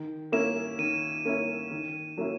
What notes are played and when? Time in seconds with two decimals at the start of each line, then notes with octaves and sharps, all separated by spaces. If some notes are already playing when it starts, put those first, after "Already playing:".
Already playing: D#3
0.32 A#3 C#4 E4 E7
0.79 D#3 D#7
1.25 A#3 C#4 E4
1.71 D#3
2.17 F#3 A#3 C#4 E4